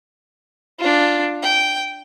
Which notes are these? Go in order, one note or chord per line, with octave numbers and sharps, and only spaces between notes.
D4 F4
G5